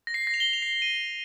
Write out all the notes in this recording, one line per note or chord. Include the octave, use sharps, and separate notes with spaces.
A#6
C7
A#6
F7
G7
F7
C7
C7
D#7